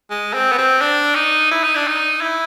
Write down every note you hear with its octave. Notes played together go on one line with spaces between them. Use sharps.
G#3
C4
B3
C4
D4
D#4
E4
D#4
D4
D#4
E4